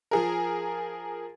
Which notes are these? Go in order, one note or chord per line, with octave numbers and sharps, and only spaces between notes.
F3 G#4 A#4